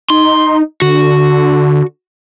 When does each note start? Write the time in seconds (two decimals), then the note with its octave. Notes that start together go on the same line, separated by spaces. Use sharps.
0.10 D#4 C6
0.82 D3 F#4